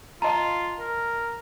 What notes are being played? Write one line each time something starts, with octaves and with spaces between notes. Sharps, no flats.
F4 D#5 A5 A#5
A#4